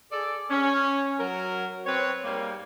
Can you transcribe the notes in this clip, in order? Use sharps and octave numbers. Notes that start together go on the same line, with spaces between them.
G#4 A4 D5
C#4
F#3 A#4
C4 B4 C#5
G#2 G3 A#3